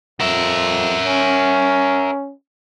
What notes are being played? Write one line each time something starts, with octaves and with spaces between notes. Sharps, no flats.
F2 A#4 E5
C#4